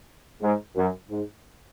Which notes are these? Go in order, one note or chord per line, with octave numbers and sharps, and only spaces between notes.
G#2
F#2
G#2